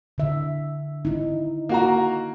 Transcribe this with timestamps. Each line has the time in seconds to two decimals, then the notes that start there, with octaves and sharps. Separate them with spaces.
0.18 D3 E5
1.05 D#4 E4
1.69 A#3 F#4 A#5